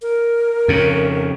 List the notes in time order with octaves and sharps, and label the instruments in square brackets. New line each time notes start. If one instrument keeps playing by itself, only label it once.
[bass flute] A#4
[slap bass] F2 C#3